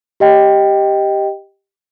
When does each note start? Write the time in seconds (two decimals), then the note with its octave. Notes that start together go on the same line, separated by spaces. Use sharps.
0.20 G4 D#5 G5